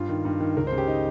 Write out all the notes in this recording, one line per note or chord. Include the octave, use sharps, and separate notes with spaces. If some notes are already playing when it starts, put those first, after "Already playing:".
Already playing: G2 F4
D#3
G2
D#3
C#2 A#4
C5
C#3
G4
D#4